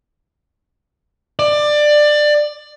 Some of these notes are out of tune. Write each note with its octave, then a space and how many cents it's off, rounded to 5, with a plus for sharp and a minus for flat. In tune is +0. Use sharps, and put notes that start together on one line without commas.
D5 +20